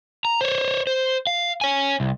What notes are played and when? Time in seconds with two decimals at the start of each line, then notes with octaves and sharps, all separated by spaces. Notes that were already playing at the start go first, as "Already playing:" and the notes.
0.25 A#5
0.41 C5 C#5
0.87 C5
1.27 F5
1.61 C#5 G#5
2.00 C2